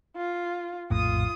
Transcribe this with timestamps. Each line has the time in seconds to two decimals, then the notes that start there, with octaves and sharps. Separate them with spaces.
0.16 F4
0.90 A#1 F2 A2 F4 D#6